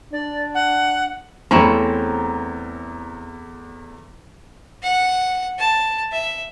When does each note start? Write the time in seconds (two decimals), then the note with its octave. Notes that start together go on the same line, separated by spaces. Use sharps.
0.13 D4 D5
0.55 F#5
1.51 E2 A3 C4 C#4 E4 A#5
4.83 F#5
5.59 A5
6.12 E5